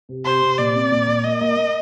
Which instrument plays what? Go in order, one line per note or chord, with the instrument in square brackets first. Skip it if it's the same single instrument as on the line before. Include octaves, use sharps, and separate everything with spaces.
[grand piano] C3
[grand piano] C3 [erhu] C5
[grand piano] C3
[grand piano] A#2 [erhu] D5
[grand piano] C4
A#2
A#2
[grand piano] A#3 [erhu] D#5
[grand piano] A#3
A#3